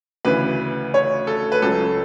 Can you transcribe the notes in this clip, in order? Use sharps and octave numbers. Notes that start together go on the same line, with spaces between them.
D2 C#3 E3 B4
C#5
A4
B4
C#2 C#3 F#3 A4